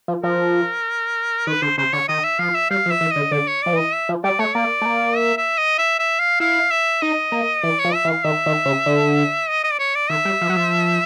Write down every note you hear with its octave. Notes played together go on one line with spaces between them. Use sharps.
F3
F3 A#4
D#3 B4
D3 C5
C#3 C5
D3 C#5
D#3 D#5
E5
F3 F5
E5
G3 F5
F3
E5
E3
D#5
D3
D3 D5
C#5
F3 D5
E3
D#5
E5
F3
G3 D5
A3 C#5
A#3 D5
A3
A#3
E5
E5
D#5
E5
E5
F5
E4 F5
E5
D#4 D#5
A#3
E3 D5
C#5
F3
E5
E3
F5
D#3 E5
D#3
C#3
D3
D#5
D#5
D5
C#5
D5
D#3 E5
G3
F3
F#3
F3